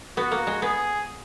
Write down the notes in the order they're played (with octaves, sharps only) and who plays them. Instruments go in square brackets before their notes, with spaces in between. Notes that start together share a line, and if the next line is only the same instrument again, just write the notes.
[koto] B3 [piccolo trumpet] F#4
[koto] A#3
G#3
[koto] B3 [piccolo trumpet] G#4